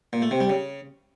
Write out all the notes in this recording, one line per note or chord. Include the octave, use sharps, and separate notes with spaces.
A#2
A3
C3
G3
C#3